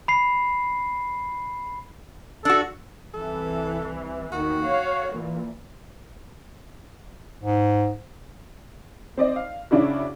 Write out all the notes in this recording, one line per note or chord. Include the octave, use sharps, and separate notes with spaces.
B5 C7
D4 F#4 A4
C2 E3 A4
D#2 D#3 F#4
C#5 F5
A#2 E3
G#2
C4 D5 D#5
F5
C#3 D4 E4 F#4